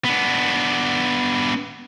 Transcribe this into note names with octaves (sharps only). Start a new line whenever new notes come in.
B3 D4